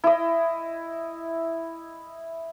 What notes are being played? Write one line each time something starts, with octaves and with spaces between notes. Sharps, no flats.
E4 D#5